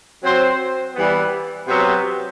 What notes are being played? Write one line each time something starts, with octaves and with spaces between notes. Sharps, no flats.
F#3 C4 F#4 C5
E3 G3 B3
C3 F#3 B3